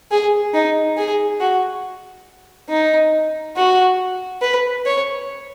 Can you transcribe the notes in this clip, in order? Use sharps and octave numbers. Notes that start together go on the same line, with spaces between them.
G#4
D#4
G#4
F#4
D#4
F#4
B4
C#5